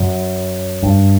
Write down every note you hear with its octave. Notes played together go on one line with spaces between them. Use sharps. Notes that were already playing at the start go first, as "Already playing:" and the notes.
Already playing: F#2
G2